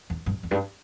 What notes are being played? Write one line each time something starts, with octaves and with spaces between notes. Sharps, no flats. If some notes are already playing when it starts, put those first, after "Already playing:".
E2
G2
E2
G2